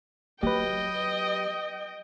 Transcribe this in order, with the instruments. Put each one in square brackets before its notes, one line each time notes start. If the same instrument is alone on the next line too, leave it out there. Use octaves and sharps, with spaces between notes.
[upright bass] F#3 [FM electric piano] G4 B4 [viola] D#5 G5